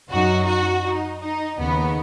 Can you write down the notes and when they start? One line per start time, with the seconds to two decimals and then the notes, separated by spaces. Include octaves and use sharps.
0.11 F#2 F#3 D#4 F#4
0.47 F#4
0.84 D#4
1.21 D#4
1.58 D#2 C#3 B3 D#4